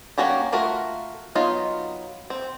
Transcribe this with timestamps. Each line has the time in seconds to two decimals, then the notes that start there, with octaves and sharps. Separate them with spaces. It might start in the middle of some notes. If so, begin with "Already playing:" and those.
0.18 F#3 A#3 C#4 F#4 G4
0.52 A3 F4 F#4 A#4
1.35 F#3 B3 D#4 F4
2.30 C4